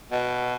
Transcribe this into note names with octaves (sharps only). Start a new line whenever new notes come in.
B2